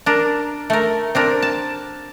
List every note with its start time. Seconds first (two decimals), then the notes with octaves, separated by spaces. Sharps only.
0.06 D4 A#4
0.70 A3 A#4
1.15 C4 D4 A#4
1.42 A5